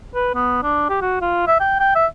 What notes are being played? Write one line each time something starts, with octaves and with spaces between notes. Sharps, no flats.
B4
B3
D4
G4
F#4
F4
E5
G5
G5
E5